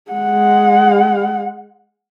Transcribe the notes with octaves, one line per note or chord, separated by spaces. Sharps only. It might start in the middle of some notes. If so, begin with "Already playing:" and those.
G#3 F#5